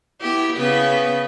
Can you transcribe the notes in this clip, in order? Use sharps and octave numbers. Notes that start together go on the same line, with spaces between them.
B3 E4 G4
C#3 B3 B4